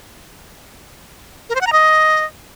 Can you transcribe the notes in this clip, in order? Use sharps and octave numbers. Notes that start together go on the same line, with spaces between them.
A#4
C5
F#5
A#5
D#5